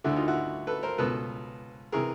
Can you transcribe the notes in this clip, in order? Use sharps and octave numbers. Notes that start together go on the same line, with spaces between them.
D2 D3 E4 F#4
D#4 F4
E4 F#4
A4 B4
A#4 C5
C#2 B2 A4 B4
C3 E3 G#4 A#4